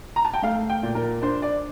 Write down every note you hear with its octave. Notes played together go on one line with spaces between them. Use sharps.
A#5
A5
G5
A3 F5
G5
A#2
A#4
D4 C5
D5